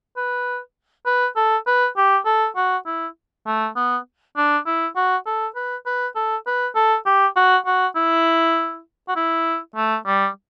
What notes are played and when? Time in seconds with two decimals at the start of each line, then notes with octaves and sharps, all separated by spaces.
0.17 B4
1.06 B4
1.36 A4
1.67 B4
1.97 G4
2.26 A4
2.56 F#4
2.86 E4
3.46 A3
3.76 B3
4.37 D4
4.66 E4
4.96 F#4
5.26 A4
5.56 B4
5.86 B4
6.16 A4
6.47 B4
6.75 A4
7.06 G4
7.36 F#4
7.66 F#4
7.96 E4
9.08 F#4
9.16 E4
9.76 A3
10.06 G3